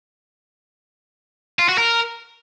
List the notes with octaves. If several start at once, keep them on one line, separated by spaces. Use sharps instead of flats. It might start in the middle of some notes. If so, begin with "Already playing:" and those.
F4
F#4
A#4